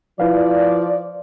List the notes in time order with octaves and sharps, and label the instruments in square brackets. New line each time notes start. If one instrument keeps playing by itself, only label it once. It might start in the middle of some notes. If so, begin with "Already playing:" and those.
[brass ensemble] F3 D5 [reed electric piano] E4 B4 F5